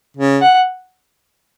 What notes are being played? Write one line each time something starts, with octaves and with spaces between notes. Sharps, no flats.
C#3
F#5